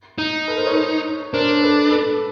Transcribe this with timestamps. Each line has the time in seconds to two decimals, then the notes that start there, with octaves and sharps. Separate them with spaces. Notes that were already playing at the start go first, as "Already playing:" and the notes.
0.18 D#4
0.47 A4 B4
0.57 A#4 C5
0.66 B4 C#5
1.33 D4 A#4 C5
1.62 A4 B4
1.91 A4 B4